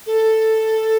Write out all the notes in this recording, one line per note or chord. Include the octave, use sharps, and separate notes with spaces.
A4